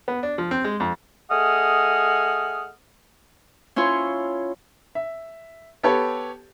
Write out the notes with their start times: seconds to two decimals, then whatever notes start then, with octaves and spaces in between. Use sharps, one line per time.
0.08 B3
0.23 D4
0.38 F3
0.51 C4
0.64 G#3
0.80 F2
1.30 A3 G#4 D#5 F#5 D#6 F6
3.76 C#4 E4 F4 C#5 C6
4.95 E5
5.83 B3 G4 A4 B4 C#5